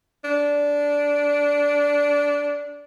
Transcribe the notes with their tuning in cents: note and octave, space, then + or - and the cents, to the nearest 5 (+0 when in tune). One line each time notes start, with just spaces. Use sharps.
D4 -15